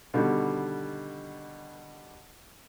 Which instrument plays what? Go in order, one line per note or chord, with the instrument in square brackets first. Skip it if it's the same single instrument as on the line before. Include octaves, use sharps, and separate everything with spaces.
[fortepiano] B2 D3 D#3 G3